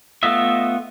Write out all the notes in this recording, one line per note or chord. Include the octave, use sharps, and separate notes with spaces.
A3 B3 F4 D#5 E5